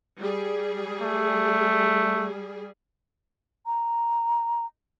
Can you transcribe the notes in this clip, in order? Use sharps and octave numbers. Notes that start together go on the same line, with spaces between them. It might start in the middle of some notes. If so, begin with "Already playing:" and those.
G3 G#4
A3
A#5